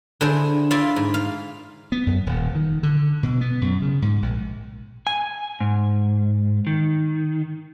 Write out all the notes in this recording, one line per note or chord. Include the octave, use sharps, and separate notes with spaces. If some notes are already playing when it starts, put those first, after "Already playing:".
D3 D4 E4 G#4 C5
E4 F4 D5 E5 F5
G#2
F5
B3
F#2
D#1
D#3
D3
B2
B3
F#2
C#3
G#2
A#1
G#5
G#2
D#3